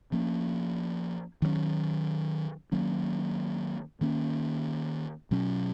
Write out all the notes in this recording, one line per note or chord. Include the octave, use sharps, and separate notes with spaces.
F3 A#3 C#4
D#3 F#3 A#3 C#4
D#3 F#3 A#3 C#4
D#3 A#3 C#4
B2 F#3 C#4